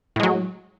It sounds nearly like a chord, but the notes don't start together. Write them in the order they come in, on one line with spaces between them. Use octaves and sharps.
A2 G#3 F#3